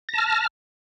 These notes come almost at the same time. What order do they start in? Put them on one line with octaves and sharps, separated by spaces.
A#6 A5 F6